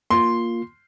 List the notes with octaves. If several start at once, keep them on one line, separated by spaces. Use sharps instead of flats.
A#3 F4 C6